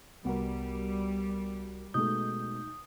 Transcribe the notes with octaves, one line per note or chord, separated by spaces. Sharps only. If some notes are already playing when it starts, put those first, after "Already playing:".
C2 G3 B3 F#4 A#4
B2 G#3 A3 D#4 D#6 G6